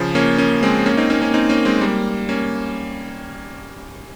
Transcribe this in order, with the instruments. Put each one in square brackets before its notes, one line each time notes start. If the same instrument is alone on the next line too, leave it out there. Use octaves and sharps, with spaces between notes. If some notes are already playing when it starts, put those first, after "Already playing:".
Already playing: [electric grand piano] C#3 F3
A#3 C#4
A#3 C#4
G#3 C4
A#3 C#4
C4 D#4
A#3 C#4
A#3 C#4
C4 D#4
A#3 C#4
G#3 C4
G3 A#3
A#3 C#4